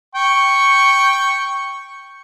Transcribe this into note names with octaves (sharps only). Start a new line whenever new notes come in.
G5 C#6